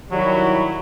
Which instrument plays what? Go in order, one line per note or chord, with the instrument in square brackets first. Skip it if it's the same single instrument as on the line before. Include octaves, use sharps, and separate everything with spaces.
[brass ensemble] D#3 G3 [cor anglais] F#3 [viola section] E4 F#4